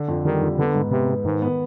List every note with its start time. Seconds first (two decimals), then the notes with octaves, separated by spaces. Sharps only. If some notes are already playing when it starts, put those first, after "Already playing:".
Already playing: D3
0.08 F2
0.25 D#3 G3
0.41 F2
0.58 D3 B3
0.74 G#2
0.91 C3 B3
1.09 B3
1.25 G#2 D#3
1.42 B3